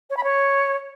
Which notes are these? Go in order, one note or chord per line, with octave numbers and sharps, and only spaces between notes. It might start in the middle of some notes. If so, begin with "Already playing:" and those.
C#5
B5
C#5